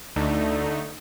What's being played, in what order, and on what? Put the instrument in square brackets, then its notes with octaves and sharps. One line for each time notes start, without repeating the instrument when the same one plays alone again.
[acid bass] D2 [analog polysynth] D3 A3 D#4